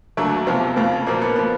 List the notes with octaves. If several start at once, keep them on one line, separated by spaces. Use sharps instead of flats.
D#2 D3 F#3 A3
E2 C3 F3
F2 C#3 F3
A#1 A#2 F3 A#3
B3
F3 B3